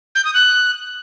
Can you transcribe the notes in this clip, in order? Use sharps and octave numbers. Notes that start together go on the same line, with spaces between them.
G6
D#6
F#6